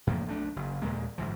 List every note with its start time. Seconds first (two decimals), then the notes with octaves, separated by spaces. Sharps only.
0.07 F#2 A2 F3 A#3
0.26 B1 A3 D4
0.56 F#1
0.82 D#2 A#2 G#3 A#3
1.18 G1 G#2 E3 F3